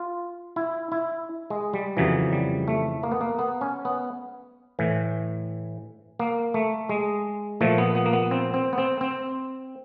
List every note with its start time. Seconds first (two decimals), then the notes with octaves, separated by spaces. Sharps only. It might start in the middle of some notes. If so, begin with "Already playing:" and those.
Already playing: F4
0.56 E4
0.92 E4
1.50 G#3
1.73 G3
1.97 F2 C#3 E3 F#3
2.33 G3
2.68 A3
3.03 A#3
3.12 B3
3.21 A#3
3.39 B3
3.61 C#4
3.85 B3
4.79 A2 E3
6.19 A#3
6.54 A3
6.89 G#3
7.61 A#2 F3 A3
7.78 B3
7.95 B3
8.06 A#3
8.13 B3
8.31 C4
8.54 C4
8.73 B3
8.78 C4
9.01 C4